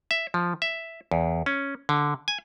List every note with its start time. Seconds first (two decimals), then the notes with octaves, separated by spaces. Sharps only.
0.11 E5
0.34 F3
0.62 E5
1.12 E2
1.46 C#4
1.89 D3
2.28 G#5